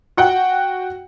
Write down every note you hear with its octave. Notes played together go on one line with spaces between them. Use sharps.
F#4 F#5 G5